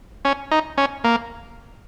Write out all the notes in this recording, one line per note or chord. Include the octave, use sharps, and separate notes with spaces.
C#4
D#4
C#4
A#3